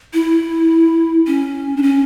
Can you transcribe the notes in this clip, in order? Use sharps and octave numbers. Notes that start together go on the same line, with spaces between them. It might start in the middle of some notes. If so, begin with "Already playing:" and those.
E4
C#4
D4
C#4